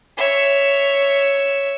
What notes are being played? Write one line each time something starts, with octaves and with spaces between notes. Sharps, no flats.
C#5 E5